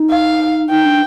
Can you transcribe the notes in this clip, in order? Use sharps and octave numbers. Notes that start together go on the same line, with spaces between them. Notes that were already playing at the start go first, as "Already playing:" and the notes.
Already playing: D#4
F5
D#4 G5
D4